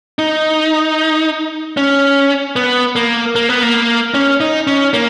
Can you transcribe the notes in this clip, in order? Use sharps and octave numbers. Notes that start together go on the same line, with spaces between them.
D#4
C#4
B3
A#3
A#3
B3
A#3
C#4
D#4
C#4
A#3